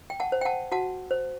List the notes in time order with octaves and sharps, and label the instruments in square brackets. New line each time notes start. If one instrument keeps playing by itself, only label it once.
[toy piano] G5
F#5 A5
C5
G5
F#5 A5
F#4 F#5 A5
C5